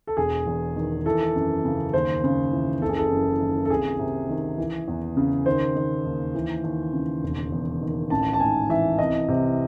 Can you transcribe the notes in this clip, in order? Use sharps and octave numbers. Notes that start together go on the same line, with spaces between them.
A4
E1 G#4
E2
D#3
E3 A4
F#2
C#3
D#2 C5
C#3
E3
F#1 A4
G#4
A4
F#2
D#3
A4
C2 G#4
C3
D#3
E3
E2
C#3
D#3 C5
D#3
D#2
E3
D#2
C#3
E1
E2
D#3
A1 A5
A5
G#2 G#5
E3 E5
C2 D#5
C3